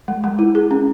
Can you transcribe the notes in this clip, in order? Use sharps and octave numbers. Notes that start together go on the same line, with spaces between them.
G#3
G#3
E4
G#4
C#4